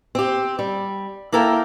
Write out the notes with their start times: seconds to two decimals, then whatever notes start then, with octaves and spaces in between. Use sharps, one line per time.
0.15 C4 G4
0.59 G3
1.32 A#3 E4 A4 A#4 G5